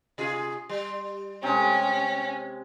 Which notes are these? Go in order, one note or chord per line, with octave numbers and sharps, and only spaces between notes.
C3 F4 G#4
G3
C3 G#3 C#4